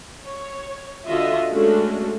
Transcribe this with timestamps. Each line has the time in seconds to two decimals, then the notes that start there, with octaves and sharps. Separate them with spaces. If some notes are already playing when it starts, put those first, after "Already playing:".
0.23 C#5
1.07 D3 F4 F#4 D#5 E5
1.51 G#3 A3 C#4 D4 F#4 A4